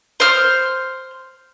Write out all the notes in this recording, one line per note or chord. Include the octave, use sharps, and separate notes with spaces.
C5 F6